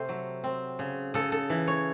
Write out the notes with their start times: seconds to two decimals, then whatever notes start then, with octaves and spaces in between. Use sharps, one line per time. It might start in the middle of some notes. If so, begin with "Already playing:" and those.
Already playing: C3 A3 A4 C5
0.09 F#3
0.44 C4
0.79 C#3
1.14 C#3 A4
1.32 A4
1.50 E3
1.67 C#5